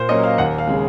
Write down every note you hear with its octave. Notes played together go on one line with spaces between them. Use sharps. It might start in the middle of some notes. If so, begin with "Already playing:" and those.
Already playing: A#2 C5
F#3 A#3 C#4 D#5
F5
D#2 F#5
F5
C#3 G#3